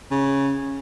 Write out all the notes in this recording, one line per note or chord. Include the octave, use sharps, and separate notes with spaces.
C#3